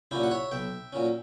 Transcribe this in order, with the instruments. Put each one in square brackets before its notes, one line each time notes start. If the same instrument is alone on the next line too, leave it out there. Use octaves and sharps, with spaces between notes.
[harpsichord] A#2 F#3 C#4 E4 G4
F#5
C#5 E5
B1 E5 G5
A#2 F#3 C#4